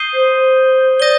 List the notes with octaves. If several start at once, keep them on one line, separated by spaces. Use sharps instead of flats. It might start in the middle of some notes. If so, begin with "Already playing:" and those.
Already playing: D#6 G6 C7 D#7 G7
C5
D5 D#6 G6 A#6 D#7 G7